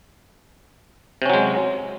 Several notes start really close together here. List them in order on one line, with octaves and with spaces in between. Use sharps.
C3 C#4 F#3 G#3